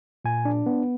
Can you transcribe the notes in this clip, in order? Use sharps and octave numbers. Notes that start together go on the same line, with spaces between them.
A#2 G#5
D4
B3